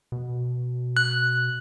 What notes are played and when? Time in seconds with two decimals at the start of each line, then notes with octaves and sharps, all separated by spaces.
0.12 B2
0.97 F#6